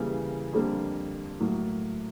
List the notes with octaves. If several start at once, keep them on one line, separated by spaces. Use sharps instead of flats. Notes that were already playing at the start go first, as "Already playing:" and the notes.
Already playing: C#3 E3 G3 A#3
F2 D3 G3 A#3
A2 F#3 A#3